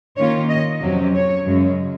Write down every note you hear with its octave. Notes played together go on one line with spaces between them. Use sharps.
D#3 A#3 C#4 F4 C#5
D#5
F2 C3 F#3 C#4
C#5
F#2 C#3 G#3